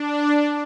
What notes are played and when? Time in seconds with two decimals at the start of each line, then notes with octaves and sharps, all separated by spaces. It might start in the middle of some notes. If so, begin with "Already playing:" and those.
Already playing: D4